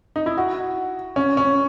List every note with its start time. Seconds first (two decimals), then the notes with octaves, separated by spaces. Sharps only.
0.16 D#4
0.26 E4
0.38 F#4
1.16 C#4
1.37 C#4